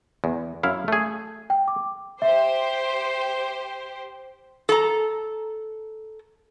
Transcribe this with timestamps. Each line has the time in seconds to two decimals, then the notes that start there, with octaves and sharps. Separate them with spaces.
0.24 E2
0.63 F#2 E4 F5
0.88 A3 G#4
1.50 G5
1.68 D6
2.22 G4 C5 E5
4.69 A4 A#5